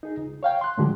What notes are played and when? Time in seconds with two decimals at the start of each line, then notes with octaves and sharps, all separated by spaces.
0.03 D#4 G#4
0.17 C#2
0.43 C#5 F5 G5
0.61 C6 F#6
0.77 A2 D3 F3 F#3 G#3 G4